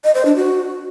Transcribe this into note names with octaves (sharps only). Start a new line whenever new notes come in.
D#5
C5
D4
F#4